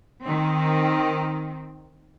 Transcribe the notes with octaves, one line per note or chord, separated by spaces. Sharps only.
D#3 C4